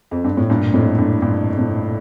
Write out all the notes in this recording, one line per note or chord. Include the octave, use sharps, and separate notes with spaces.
F2
G2
A2
G2 A#2
F2 A2
G2
G2 A#2
A2 C3